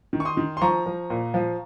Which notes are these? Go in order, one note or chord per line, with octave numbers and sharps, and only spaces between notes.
D#3
C#6
C6 D#6
D#3
C6
F3 A#5 C#6
F3
A#2
F3